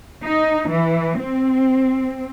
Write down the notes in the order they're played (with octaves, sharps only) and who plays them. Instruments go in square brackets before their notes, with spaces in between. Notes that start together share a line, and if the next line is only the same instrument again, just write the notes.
[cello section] D#4
E3
C4